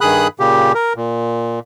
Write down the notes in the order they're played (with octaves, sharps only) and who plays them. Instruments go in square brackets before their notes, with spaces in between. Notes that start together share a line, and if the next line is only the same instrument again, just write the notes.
[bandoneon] G2 D#3 G#4 B5 D#6 F#6
A#2 C#3 G4
A#4
A#2